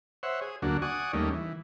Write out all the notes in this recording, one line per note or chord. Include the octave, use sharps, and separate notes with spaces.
C5 C#5 E5 F#5
G#4
D2 F#3 A#3 D4 F#4
D5 F#5 G#5 C#6 D#6
D#2 G3 A3 A#3 C#4 D#4
E3